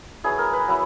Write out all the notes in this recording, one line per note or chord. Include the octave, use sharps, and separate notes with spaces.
F#3 B3 E4 G#4
A#4
B4
F#3 B3 E4